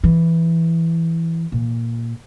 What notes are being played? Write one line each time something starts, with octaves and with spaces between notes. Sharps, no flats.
E3
A#2